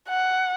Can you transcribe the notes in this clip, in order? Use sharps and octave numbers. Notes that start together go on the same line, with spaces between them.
F#5